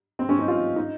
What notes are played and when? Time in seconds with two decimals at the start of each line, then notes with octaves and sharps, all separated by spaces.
0.19 C4
0.29 C#4
0.39 D#4
0.48 F4
0.76 D#4